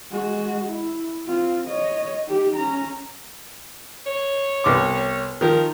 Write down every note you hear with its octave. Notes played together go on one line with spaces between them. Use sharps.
G#3 F#4
E4
C4 F4
C#5 D#5
D#4 G4
C#4 A#5
C#5
C2 B3 D6
D#3 F3 A#4